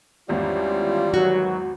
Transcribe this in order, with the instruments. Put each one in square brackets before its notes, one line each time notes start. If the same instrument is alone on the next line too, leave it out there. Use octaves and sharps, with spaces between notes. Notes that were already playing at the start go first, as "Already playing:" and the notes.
[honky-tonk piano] G#1 E2 [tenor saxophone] G3 [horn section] C#4 E4 F4
[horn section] D#3 E3 F#3 [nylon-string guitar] F#4